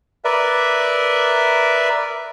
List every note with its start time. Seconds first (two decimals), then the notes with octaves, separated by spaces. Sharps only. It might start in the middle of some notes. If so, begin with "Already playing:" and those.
0.25 A#4 B4 D5 E5